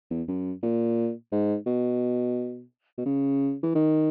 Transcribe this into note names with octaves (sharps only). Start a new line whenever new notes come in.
E2
F#2
A#2
G#2
B2
B2
C#3
E3
D#3